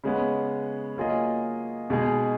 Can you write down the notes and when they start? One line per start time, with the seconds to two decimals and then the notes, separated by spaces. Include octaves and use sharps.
0.04 C#3 G#3 B3
0.97 F#3 A#3 F4 G#4 D#5
1.90 B2 G#3 D#4 G#4